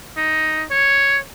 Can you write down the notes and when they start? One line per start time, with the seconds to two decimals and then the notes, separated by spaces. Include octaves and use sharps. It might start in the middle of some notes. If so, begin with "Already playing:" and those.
0.17 D#4
0.71 C#5